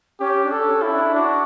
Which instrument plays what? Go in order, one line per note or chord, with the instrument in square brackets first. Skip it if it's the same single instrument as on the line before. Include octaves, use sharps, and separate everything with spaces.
[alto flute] C#4 [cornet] G4
[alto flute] D4
[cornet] A4
[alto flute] C#4
[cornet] E4
[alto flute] D4
[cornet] D4 [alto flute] F#4